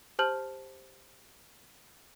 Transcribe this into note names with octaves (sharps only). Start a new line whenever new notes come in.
G4 C5 A5 F6 G6 F#7